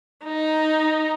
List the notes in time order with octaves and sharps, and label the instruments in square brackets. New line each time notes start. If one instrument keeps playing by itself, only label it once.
[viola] D#4